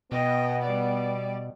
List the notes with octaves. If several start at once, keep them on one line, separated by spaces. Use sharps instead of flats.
B2 B3 D#5 G5
G3 D5